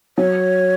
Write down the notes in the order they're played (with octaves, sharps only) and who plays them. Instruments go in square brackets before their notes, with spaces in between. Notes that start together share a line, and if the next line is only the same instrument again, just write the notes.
[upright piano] F#3 [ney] C#5